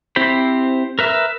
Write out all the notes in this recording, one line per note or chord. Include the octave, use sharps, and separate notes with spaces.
C4 E4 G4 C5 B5
A#4 B4 E5